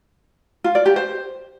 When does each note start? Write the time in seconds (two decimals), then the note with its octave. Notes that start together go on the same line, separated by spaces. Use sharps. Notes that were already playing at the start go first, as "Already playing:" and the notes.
0.64 F4
0.75 D5
0.86 G4
0.96 C5